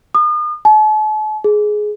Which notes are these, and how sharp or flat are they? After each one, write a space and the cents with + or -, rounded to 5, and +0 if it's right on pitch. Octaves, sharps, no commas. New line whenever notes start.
D#6 -40
A5 -45
G#4 +15